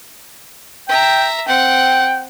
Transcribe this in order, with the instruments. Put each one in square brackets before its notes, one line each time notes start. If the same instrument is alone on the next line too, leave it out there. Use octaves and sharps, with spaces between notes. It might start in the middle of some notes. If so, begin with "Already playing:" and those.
[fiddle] E5 A#5 [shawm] G5
[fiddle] C4 F#5 [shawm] G5